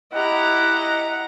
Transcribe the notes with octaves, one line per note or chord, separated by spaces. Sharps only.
E4 G4 D#5 F#5 A#5